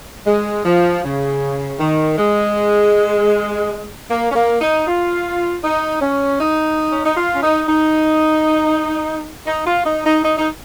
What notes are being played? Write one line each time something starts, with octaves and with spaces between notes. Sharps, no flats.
G#3
F3
C#3
D#3
G#3
A#3
C#4
A#3
D#4
F4
D#4
C#4
D#4
C#4
D#4
F4
C#4
D#4
D#4
D#4
F4
D#4
D#4
D#4
D#4